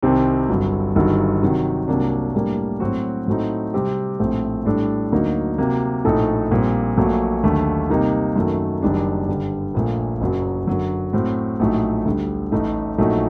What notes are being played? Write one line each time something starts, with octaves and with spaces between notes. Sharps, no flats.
C2 C3 D#3 G3 C4
G1 G2 F#3
G1 G2 D#3 F#3
C3 D#3 F#3
C2 C3 F#3 A#3 D4
A2 G3 A#3 D4
A2 F#3 C4 F#4
A2 F#3 A3 C4 D#4
C3 G3 C4 G4
A#1 A2 A3 C4
A2 G3 D4 A4
D2 D3 F#3 A#3 D#4
C3 F#3 A#3
A#1 A2 A3 D#4 A4
A#1 A#2 G3 C4
A#1 A#2 F#3 A3
D#2 D3 F#3 A3
C3 G3 A#3 D#4
F#2 D#3 F#3 A3
F#1 F#2 D#3 G3 D4
G2 D3 G3
A#1 A#2 A3
F#1 F#2 F#3
F#2 D3 F#3
A2 F#3 C4 F#4
A#1 A2 F#3 A3 D#4
D2 D3 G3
A1 A2 A3 D#4
A#1 A#2 F#3 A3 D#4